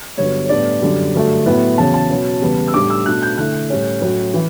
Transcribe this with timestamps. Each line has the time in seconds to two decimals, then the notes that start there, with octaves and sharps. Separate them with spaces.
0.17 G2 D3 F#3 B3 C#5
0.45 C#5
0.49 A2 G3 B3 D4 D5
0.82 F#2 D3 G3
1.14 G2 D3 F#3 A3
1.46 A2 F#3 B3 E4
1.78 E2 C#3 F#3 C#4 A5
1.94 A5
2.10 B2 F#3 C#4
2.42 E2 C#3 G3 B3
2.68 E6
2.74 A2 G3 D4 D6
2.90 E6
3.06 B2 A3 D4 F#6
3.22 G6
3.38 D3 A3 E4 F#6
3.70 A2 G3 C#4
4.02 A2 F#3 C#4
4.34 E3